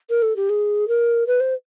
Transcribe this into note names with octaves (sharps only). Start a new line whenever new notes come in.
A#4
A4
G4
G#4
A#4
B4
C5